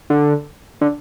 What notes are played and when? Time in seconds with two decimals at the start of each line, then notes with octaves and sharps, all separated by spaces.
0.10 D3
0.81 D3